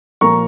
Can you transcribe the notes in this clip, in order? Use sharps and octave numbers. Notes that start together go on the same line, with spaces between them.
A#2 F3 A#3 A#5 C#6